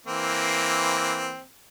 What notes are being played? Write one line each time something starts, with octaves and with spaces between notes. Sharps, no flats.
E3 A#3 C4